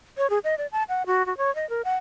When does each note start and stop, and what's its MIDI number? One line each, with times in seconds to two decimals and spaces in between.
0.18 0.29 73
0.30 0.39 68
0.44 0.55 75
0.58 0.67 74
0.72 0.83 81
0.89 1.06 78
1.06 1.25 66
1.26 1.36 66
1.37 1.53 73
1.55 1.68 75
1.70 1.82 70
1.85 1.96 78